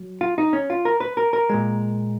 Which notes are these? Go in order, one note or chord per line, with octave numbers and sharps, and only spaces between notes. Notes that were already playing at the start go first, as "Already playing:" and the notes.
Already playing: F#3
F4
D#4
C#4
F4
A#4
B4
A#4
A#4
A#2 G#3